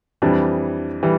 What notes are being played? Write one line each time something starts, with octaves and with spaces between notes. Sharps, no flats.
F2 E3 G3 D4
E3 G3